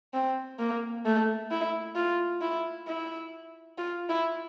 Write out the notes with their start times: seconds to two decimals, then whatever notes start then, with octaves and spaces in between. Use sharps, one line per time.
0.14 C4
0.59 A#3
1.06 A3
1.51 E4
1.96 F4
2.42 E4
2.88 E4
3.78 F4
4.09 E4